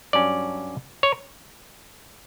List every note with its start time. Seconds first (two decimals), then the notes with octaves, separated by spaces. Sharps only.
0.13 G2 F#3 C#4 D5
1.03 C#5